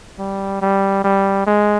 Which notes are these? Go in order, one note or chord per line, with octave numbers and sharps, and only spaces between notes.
G3
G3
G3
G#3